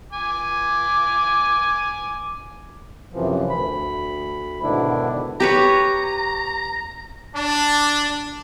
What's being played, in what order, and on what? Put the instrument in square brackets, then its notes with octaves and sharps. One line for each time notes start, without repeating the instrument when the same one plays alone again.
[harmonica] G#5 D6
[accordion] F#2 C3 E3 F3
D2 B5
G#2 B2 D3 D#3 D4 E4
[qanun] G4 B4 C#5 [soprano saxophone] A#5
[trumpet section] D4 A5